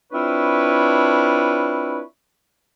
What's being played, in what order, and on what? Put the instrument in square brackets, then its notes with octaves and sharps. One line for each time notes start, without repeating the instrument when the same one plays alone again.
[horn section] C4 D4 E4 F4 B4 C#5